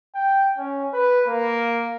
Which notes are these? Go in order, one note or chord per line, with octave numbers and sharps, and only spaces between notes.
G5
C#4
B4
A#3